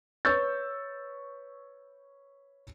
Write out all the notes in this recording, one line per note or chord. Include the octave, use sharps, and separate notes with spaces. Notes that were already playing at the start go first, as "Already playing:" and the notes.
B4 C#5 C#6 E6 G6 A6